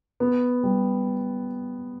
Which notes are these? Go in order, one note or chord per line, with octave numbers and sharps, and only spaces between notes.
B3
G3